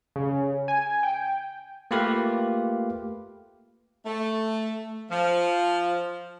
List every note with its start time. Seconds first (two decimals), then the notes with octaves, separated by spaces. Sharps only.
0.16 C#3
0.68 G#5
1.03 G5
1.91 A3 A#3 F4 G4 B4 F5
4.05 A3
5.10 F3